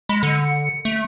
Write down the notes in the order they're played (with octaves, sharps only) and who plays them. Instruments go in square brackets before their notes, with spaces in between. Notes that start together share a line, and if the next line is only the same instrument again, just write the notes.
[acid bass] G#3 [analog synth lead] B5
[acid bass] D3 [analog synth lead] C#7
[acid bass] A3